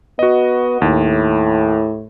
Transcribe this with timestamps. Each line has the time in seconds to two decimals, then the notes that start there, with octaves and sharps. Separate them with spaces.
0.19 B3 F#4 D#5
0.82 D#2 A2